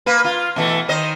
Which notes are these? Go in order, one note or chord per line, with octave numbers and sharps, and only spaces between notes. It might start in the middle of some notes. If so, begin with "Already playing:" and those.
A#3 B4
F4
B2 E3 A3
D#3 C5 D#5